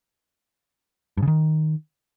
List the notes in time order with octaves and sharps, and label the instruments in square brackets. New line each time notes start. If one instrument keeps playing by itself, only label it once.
[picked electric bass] G2
C#3
D#3